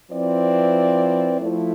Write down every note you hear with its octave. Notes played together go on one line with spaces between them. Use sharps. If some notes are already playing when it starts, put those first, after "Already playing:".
F3 C4 E4 B4 D5
F3 A3 E4